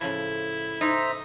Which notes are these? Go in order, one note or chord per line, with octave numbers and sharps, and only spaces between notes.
A2 C#3 F3 E4
D#4 C5 E5 A#5